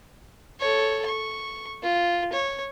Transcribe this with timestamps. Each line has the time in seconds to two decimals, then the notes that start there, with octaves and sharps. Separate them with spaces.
0.61 A4 C#5
1.06 C#6
1.83 F4
2.32 C#5